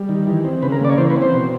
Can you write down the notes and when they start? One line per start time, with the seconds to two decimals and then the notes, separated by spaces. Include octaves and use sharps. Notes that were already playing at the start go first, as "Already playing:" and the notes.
Already playing: G3
0.09 D#3
0.27 E3
0.44 C4
0.62 C#3 B4
0.72 A#4
0.81 A#3 D5
0.90 C#5
0.98 E3 C5
1.10 B4
1.16 C4
1.22 C5
1.34 B2